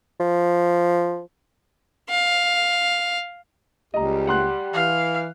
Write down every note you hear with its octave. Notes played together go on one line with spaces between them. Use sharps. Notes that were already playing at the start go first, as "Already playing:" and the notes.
F3
F5
C#2 G3 G4 D#5 A#5
F#5 C6 F#6
E3 F5